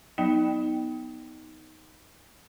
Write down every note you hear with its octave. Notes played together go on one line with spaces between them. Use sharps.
F#3 B3 D#4